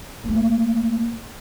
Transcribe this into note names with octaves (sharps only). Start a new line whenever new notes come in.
A3 A#3